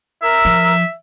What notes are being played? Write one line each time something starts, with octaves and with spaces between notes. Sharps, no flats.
A#4 E5 A#5 E6
F3